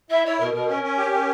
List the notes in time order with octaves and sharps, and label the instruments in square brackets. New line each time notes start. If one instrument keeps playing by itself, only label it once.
[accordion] E4 [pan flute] E5
[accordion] E4 [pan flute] C#5
[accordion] B2 [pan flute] A#4
[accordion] B2 [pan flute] A#4
[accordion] C#4 [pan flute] A#4
[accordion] C#4
G4
C#4